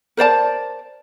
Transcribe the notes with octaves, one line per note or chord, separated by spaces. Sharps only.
A#4 C5 D5 A5